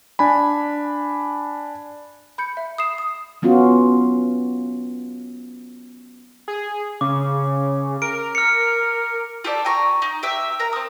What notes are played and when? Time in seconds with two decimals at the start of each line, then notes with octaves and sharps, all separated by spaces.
0.19 D4 G#5 B5
2.38 B5 G6 C#7
2.57 E5
2.78 D#6 C7 E7
2.98 D#6
3.42 F#3 B3 C#4 F4 F#4
6.48 G#4
7.01 C#3 D6
8.02 A#4 D7
8.35 F6 C#7
9.44 F4 G4 A4 D5
9.65 G5 G#5 A#5 C#6
10.02 D#4
10.23 G4 E5
10.60 A#4 A#5
10.73 C4 D#6